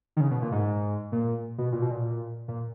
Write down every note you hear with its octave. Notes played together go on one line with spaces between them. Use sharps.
D#3
C#3
B2
A#2
G#2
A#2
B2
A#2
B2
A#2
A#2